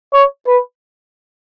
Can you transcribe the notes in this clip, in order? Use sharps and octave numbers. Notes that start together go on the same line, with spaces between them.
C#5
B4